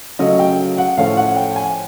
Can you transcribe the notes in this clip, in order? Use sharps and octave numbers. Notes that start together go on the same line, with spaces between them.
C#3 F#3 A3 C#4 D#5
G5
F#5
A2 F3 A3 C#4 F5
F#5
G5
G#5